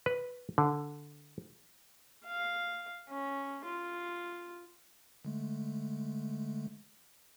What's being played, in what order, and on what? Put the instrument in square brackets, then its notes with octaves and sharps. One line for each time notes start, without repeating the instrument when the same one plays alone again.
[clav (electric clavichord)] B4
D3
[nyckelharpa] F5
C#4
F4
[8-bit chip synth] D3 G#3 A3